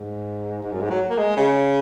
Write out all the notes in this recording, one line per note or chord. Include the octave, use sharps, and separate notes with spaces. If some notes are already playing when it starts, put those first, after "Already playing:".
Already playing: G#2
G#2
F#2
G#2
F#3
A#3
G#3
C#3